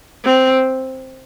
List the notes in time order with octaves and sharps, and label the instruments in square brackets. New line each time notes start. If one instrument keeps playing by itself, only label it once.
[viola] C4